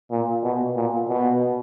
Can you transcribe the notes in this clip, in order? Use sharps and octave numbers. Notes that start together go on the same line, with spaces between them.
A#2
B2
A#2
B2